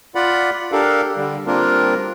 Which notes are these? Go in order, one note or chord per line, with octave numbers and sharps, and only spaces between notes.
F4 D5 F#5 B5
D4 G4 A4 A#4 F5
D3 G3
G3 A#3 C4 D4 F4 A#4